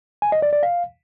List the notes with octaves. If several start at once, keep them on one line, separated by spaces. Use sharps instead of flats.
G#5
D#5
D5
D5
F5